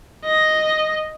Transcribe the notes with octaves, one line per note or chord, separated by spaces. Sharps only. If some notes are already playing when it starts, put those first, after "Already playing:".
D#5